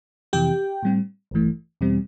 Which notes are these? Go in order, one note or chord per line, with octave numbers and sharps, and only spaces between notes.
F2 C3 E3 G4 G5
A2 G3 C4
A1 G2 E3 A3
E2 B2 G3 C4